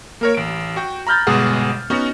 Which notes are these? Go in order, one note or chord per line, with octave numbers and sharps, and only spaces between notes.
A#3 A#4 C#5
A1 D7
F#4 G5
A#5 B5 F6 G6 A6
G1 B2 G#3 G#4 F#5
B3 C#4 D#4 F#4